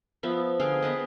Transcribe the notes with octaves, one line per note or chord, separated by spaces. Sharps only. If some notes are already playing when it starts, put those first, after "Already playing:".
F3 B3 E5
D3 G#4 F5 G5
B3 B4 D#5